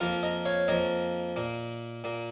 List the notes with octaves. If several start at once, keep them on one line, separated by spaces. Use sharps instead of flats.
F2 F3 A#3 F4 A#4
A#4 D#5
C#5 F5
F2 F3 A#3 A#4 D#5
A#2 A#3
A#2 A#3